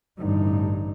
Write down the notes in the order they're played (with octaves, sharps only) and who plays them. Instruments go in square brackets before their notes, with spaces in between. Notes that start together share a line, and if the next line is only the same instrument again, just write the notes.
[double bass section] A1 G2 [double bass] D3 D#4